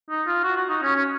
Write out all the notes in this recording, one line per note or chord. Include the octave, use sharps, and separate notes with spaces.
D#4
F4
F#4
F#4
D#4
C#4
C#4